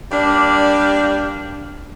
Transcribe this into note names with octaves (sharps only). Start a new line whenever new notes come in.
G3 A#3 D4